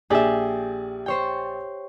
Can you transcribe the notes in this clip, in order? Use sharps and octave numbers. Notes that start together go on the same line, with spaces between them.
A#1 G4 G#4 D5 E5
C5 C#5 G5